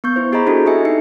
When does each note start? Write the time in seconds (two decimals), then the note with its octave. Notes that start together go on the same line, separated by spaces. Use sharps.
0.04 B3 C#6 G6
0.16 E4 C5
0.32 G4 G#4 C5 D#5 A#5 B5
0.46 C4 D4 E4 F#4 G4 A4
0.66 C4 A4 D#5 E5 G#5 C#7
0.85 D#4 E5 C#7